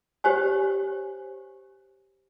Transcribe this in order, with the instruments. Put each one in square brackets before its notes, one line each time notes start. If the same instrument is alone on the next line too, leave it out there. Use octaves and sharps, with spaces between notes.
[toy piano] G4 C5 C#5 G#5